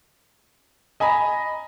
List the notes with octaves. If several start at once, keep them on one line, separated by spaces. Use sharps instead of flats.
D#5 G#5 A#5 B5